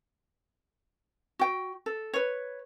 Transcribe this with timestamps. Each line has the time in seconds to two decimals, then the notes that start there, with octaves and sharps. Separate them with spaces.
1.39 F#4 G5
1.86 A4
2.14 B4 C#5